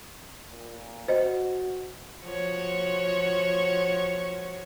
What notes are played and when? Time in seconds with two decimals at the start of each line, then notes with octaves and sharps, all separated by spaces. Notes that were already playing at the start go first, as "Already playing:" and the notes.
0.49 A#2
1.08 F#4 C5 D#5
2.22 F3 F#4 C#5